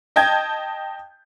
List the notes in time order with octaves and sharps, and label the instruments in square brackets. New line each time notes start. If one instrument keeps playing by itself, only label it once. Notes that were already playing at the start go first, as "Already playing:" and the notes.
[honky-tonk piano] D#5 G5 A5 G6 G#6